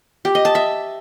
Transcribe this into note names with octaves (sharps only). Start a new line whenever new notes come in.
G4
D#5
A5
E5